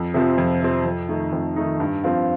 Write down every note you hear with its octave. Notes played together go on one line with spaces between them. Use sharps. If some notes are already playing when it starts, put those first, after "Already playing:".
Already playing: F2
C3 F3 C4
F2
C3 F3 C4
F2
D#3 A3 D#4
F2
D#3 A3 D#4
G2
F3 C4 F4